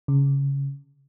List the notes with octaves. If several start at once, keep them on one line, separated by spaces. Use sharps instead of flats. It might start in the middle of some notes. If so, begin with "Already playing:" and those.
C#3